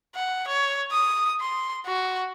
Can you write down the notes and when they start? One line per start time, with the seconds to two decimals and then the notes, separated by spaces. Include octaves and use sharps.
0.15 F#5
0.48 C#5
0.92 D#6
1.41 C6
1.87 F#4